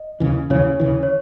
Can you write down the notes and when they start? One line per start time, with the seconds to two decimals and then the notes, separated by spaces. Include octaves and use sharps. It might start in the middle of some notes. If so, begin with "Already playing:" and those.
Already playing: D#5
0.20 D#2 C#3 E3
0.50 D#2 C#3 E3 C#5
0.80 D#2 C#3 E3
1.03 C#5